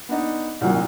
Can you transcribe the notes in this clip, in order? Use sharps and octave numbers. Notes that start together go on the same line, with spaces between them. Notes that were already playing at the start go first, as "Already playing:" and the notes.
B3 D4 D#4
C2 F#2 A#2 D#3 F#3